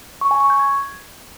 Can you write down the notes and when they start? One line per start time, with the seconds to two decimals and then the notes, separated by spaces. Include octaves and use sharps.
0.21 C#6
0.31 G#5
0.40 C#6
0.50 G6
0.59 G#6